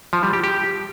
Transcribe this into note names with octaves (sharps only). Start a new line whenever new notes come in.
F3
G3
G4
G4